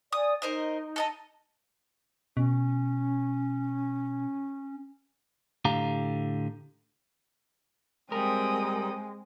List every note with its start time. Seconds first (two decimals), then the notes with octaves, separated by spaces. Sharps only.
0.12 D5 G#5 D#6
0.42 D#4 A#4 C5 D#5
0.96 A4 D#5 A#5
2.37 B2 C#4
5.65 A2 D3 G4 F5 A#5
8.12 G3 G#3 C4 A#4 G5 D#6